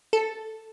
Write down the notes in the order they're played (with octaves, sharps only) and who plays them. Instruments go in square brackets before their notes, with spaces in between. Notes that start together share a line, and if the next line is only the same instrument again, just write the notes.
[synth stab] A4